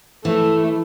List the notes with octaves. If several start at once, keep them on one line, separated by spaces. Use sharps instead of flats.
E3 A3